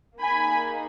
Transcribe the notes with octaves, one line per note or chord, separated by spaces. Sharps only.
A#3 D#4 G#4 G#5 B5